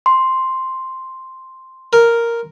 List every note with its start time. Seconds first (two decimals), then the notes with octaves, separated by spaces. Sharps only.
0.06 C6
1.93 A#4